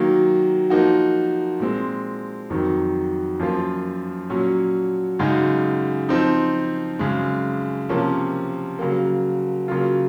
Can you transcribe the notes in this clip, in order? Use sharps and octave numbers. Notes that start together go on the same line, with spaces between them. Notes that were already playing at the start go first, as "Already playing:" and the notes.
Already playing: D#3 F#3 A#3
F3 A#3 D#4 F#4
A#2 G#3 C4
F2 D#3 F#3
F#2 F3 A#3 F4
A#2 F#3 C#4
F#2 C#3 G#3 D#4 F#4
F3 C4 D#4
F#2 C#3 G#3
C3 F3 A#3 C#4
C#3 F#3 A#3
C#3 F#3 A#3 F4